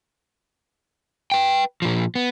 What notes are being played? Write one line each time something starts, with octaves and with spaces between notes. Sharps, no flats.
B4 G5
A#2 F3
B3